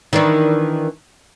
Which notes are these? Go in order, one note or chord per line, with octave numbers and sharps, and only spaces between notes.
D#3 E3 D4